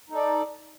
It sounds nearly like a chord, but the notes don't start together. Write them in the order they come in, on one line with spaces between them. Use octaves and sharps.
D#4 A4 D5